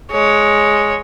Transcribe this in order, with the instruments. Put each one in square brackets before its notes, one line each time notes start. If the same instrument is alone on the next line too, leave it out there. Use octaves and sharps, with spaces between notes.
[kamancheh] G#3 C#5